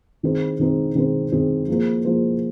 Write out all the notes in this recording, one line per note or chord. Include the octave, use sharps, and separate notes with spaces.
D#3 C4 D#4 G#4 C5
D#3 C4 D#4 G#4 C5
D#3 C4 D#4 G#4 C5
D#3 C4 D#4 G#4 C5
F3 A#3 G#4 C5
F3 A#3 G#4 C5